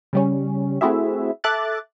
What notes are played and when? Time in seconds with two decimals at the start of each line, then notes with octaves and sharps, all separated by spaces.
0.13 C#3 G3 C#4
0.81 A3 C4 E4 F#4 G#4 E5
1.44 A4 E5 D6 F#6 A6